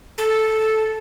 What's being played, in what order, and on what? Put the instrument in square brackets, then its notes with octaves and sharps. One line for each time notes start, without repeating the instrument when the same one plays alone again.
[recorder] A4